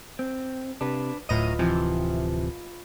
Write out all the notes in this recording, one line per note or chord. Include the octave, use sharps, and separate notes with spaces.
C4
C3 D4 B4
D1 A2 F4 B4 D#5 A#5 D#7
C3 E3 F3